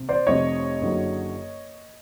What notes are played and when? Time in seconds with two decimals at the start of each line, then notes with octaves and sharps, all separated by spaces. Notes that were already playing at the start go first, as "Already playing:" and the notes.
Already playing: C3
0.09 C5 D5
0.27 F1 F2 C3 C#5 D#5
0.81 F#1 F#2 D3 F#3